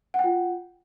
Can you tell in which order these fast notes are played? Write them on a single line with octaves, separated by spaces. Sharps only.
F#5 G5 F4